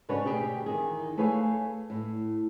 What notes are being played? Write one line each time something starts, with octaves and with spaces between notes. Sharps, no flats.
G#2 C#3 D4 F#4 B4 C#5
D2 B2 G4 G#4 G5
E2 D#3 D#4 G#4
A3 G#4 B4 C#5 F5 G#5
A2